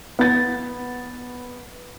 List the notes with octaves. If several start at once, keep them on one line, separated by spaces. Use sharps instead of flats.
B3 A6